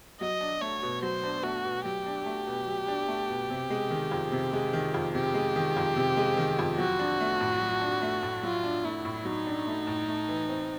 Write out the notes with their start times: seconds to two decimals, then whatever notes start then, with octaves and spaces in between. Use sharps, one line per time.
0.21 F#3 D#5
0.41 D4
0.61 A3 C#5
0.82 B2
1.02 F#3 C5
1.24 D4
1.43 A3 F#4
1.65 B2
1.85 F#3 G4
2.06 D4
2.26 A3
2.47 B2
2.67 F#3
2.88 D4
3.08 A3
3.29 B2
3.50 C3
3.70 G#3
3.90 D#3
4.11 F2
4.32 C3
4.53 G#3
4.73 D#3
4.94 F2
5.14 C3 G4
5.34 G#3
5.56 D#3
5.77 F2
5.96 C3
6.17 G#3
6.37 D#3
6.59 F2
6.78 F#3 F#4
6.99 D4
7.20 A3
7.40 A2
7.61 F#3
7.81 D4
8.02 A3
8.22 A2
8.43 F#3 F4
8.64 D4
8.84 A3 E4
9.05 A2
9.25 F#3 D#4
9.47 D4
9.67 A3
9.87 A2
10.08 A3
10.28 E3
10.49 C4